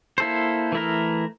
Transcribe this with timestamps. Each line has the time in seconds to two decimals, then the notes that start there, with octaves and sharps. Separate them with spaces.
0.18 A#3 E4 A4 C5
0.72 E3 A3 E4 A#4